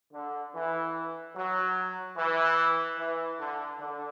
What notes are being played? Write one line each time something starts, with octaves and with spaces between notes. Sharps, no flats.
D3
E3
F#3
E3
E3
D3
D3